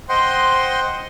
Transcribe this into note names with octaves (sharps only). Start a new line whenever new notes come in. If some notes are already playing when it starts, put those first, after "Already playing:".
C5 D#5 F#5 G5 C6